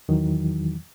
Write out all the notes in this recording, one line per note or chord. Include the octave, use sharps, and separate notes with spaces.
E2 D#3 E3 F#3